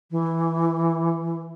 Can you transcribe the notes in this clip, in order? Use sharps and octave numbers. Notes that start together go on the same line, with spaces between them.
E3